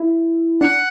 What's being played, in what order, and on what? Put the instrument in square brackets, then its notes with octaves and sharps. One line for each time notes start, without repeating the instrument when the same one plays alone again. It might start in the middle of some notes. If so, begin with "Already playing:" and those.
Already playing: [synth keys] E4
[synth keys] D4 [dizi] F#5